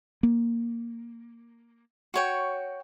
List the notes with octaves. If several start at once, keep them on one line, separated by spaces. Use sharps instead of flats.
A#3
F#4 C#5 G5